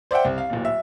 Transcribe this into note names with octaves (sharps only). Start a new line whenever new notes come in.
C5 D5 E5 F#5 G5
C2
F5
D1 A#2
E5